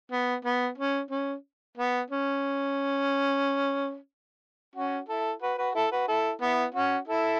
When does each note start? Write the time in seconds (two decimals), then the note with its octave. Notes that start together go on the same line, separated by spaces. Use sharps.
0.11 B3
0.45 B3
0.78 C#4
1.11 C#4
1.77 B3
2.10 C#4
4.76 C#4 F#4
5.09 E4 A4
5.42 F#4 B4
5.58 F#4 B4
5.75 E4 A4
5.92 F#4 B4
6.08 E4 A4
6.41 B3 E4
6.74 C#4 F#4
7.08 E4 A4